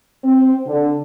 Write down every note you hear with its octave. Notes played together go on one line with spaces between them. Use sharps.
C4
D3